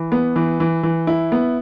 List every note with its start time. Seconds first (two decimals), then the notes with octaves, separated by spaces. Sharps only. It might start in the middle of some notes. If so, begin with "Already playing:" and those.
Already playing: E3
0.12 B3
0.36 E3
0.60 E3
0.83 E3
1.07 E4
1.32 B3